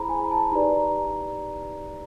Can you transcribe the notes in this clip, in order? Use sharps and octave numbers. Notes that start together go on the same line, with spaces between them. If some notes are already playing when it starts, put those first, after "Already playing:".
Already playing: E4 G#4 C5 A#5 B5
G#5
A5
D#4 G4 B4 D5 A#5